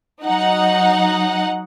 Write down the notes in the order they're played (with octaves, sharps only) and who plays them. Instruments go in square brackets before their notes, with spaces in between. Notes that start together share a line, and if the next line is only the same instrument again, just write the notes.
[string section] F#3 D#4 F#5